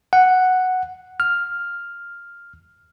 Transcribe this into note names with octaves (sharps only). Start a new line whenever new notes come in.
F#5
F6